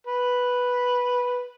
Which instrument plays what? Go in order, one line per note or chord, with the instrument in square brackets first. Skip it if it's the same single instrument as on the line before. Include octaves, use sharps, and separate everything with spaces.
[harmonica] B4